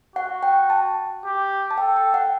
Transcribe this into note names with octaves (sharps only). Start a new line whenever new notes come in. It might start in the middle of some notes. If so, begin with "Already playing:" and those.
F#4 F#5
G5
A5
G4
A5
A4 G5
G5
F#5